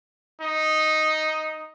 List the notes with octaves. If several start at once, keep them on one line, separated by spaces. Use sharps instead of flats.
D#4